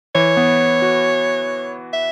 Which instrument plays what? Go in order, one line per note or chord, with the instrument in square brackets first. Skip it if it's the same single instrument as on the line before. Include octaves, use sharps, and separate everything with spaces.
[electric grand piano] E3 [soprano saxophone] C#5
[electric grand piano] B3
F#4
[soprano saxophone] E5